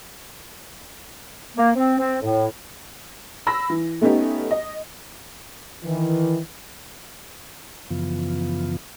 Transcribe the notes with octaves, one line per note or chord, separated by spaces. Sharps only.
A#3
C4
C4
A2
B5 E6 A#6
E3
A3 B3 C#4 D#4 G4
D#5
D#3 E3
F#2 C#3 E3 F3 B3 F4